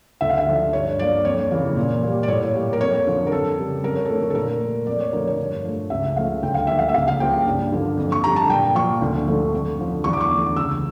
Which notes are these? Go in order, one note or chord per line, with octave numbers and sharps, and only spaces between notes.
D2 E5
F5
E5
D3 F3
G2 C#5
F3 A#3 D5
F2 C#5
C#3 E3 A#3
A#2
G3 A#3
D5
A2 C#5
G3 A#3
A#4
F2 C#5
D3 F3
A#4
F2 A4
C#3 G3
F2 A#4
C#5
A4
D3 A3 A#4
A#4
A4
A#2 A#4
A3
F2 D5
C#5
D3 F3 A3 A#4
C#5
G2
F3 A3
C#2 E5
C#3 F3 A3 F5
D2 G5
F5
D3 F3 A#3 E5
F5
E5
C#2 F5
F5
C#3 F3 A#3 G5
G2
D3 F3 A#3
F2
C#6
D3 G3 A#5
A5
A#2 G5
F3 A#3 C#6
D2
D3 F3 A3
F2
D3 F3
E2 C#6
D6
C#6
D3 A3
C#2 E6